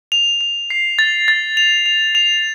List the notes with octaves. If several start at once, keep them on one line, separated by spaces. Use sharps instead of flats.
F7
F7
C7
A6
A6
F7
F7
F7